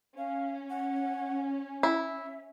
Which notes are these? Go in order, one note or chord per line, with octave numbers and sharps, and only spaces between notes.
C#4 F5
F#5
E4 E5